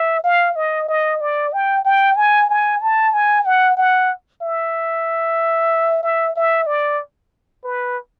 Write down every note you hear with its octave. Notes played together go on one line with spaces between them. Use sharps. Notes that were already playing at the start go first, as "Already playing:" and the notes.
Already playing: E5
F5
D#5
D#5
D5
G5
G5
G#5
G#5
A5
G#5
F#5
F#5
E5
E5
E5
D5
B4